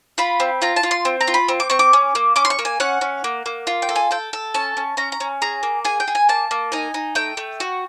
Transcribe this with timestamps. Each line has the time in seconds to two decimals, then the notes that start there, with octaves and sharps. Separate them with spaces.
0.18 F4 B5
0.40 C4
0.62 F4 A#5
0.76 A5
0.83 F4
0.91 C6
1.05 C4
1.21 A#5
1.27 F4
1.34 B5
1.48 C4
1.60 D6
1.70 C4 C#6
1.79 D6
1.93 C#4
2.15 A#3
2.36 C#4 D6
2.45 C6
2.50 C#6
2.59 A#3
2.65 G#5
2.80 C#4 F#5
3.01 C#4
3.24 A#3
3.46 A#3
3.67 F4
3.82 G5
3.89 A4
3.96 G#5
4.11 A4 G5
4.33 A4
4.54 C#4 A5
4.77 C#4
4.97 C#4 A#5
5.12 A#5
5.20 C#4
5.42 G#4 A#5
5.63 A#3
5.85 G#4 G#5
6.00 G5
6.08 G#4
6.15 G#5
6.29 A#3 A5
6.51 A#3
6.72 D#4 G#5
6.94 D#4
7.15 A3 G5
7.37 A3
7.60 F#4